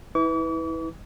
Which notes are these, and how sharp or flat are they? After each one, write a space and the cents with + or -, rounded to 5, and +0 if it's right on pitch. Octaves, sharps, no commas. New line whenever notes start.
E4 -30 B4 +5 D6 -45